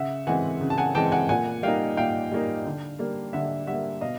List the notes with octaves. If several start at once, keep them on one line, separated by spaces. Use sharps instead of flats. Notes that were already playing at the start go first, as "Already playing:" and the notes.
Already playing: C#3 E5 F#5
E3 G#3 C4 F#5 G#5
C#3
A5
F#5 G#5
E3 G#3 C4 G5 A5
F#5 G#5
A#2 F#5 G#5
G3 A#3 D#4 F5 G5
A#2 F5 G5
G3 A#3 D#4
D3
G3 A#3
D3 E5 F#5
G3 A#3 E5 F#5
B2 D#5 F5